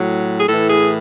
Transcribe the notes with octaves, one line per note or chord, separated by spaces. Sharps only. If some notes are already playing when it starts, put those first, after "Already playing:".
Already playing: A2 F#3
G#4
A2 E3 A4
G#4